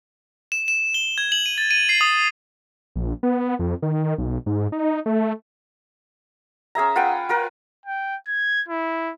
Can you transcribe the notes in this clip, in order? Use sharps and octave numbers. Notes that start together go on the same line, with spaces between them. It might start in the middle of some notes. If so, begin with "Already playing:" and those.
E7
E7
G7
G#6
F#7
D#7
A6
D#7
C7
D#6
A#1
B3
F2
D#3
B1
G#2
D#4
A3
C#4 G#4 E5 A#5
F4 B4 F#5 G5
F4 A#4 B4
G5
G#6
E4